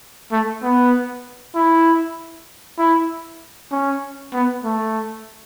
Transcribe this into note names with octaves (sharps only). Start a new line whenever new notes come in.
A3
B3
E4
E4
C#4
B3
A3